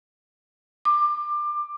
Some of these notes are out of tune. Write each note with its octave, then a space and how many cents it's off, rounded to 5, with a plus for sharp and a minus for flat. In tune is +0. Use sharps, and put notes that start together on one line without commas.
D6 +20